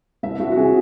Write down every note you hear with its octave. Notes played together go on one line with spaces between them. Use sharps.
C2 E5
C2 F#4
F#4
C3 G#4